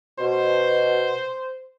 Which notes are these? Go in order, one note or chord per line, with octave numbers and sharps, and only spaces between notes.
B2 C5